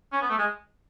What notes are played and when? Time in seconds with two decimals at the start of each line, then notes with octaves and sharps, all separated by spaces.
0.12 C#4
0.21 B3
0.29 A3
0.38 G#3